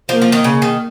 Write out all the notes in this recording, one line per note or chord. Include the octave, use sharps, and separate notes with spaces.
F3 A#3
F3
D#3
C#3
D#3